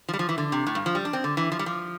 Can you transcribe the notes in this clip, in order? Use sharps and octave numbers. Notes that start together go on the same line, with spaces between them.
F3
G3
F3
E3
D3
C3
A2
G2
F3
G3
D4
C4
D3
E3
F3
G3
F3